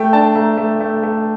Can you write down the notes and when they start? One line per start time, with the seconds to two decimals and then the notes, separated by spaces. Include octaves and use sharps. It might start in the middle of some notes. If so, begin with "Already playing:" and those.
Already playing: A3 G5
0.13 D4 A5
0.35 A3 A#5
0.57 A3
0.80 A3
1.03 A3